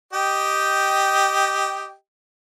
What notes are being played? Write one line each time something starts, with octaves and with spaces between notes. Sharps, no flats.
G4 D#5 G5